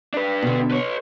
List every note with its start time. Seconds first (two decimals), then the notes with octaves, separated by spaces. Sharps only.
0.14 D4 B4
0.42 B2 D3
0.71 B4 C#5